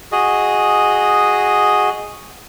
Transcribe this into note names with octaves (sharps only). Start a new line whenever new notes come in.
F#4 G#4 D#5